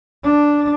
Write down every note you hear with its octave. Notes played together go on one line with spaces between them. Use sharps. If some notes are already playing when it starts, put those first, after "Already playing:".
D4